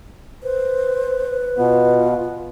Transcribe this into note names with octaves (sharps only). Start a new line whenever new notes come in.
B4 C5
B2 B3 F4